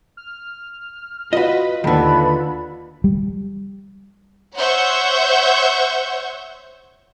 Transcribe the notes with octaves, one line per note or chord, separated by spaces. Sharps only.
F6
F4 F#4 B4 D#5
D#2 D3 D#3 A4 B4 B5
G3
C5 C#5 E5 F#5 C#6 G6